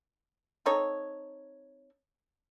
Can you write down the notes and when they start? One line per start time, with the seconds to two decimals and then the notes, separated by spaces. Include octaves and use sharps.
0.66 C4 D#4 A4 C#5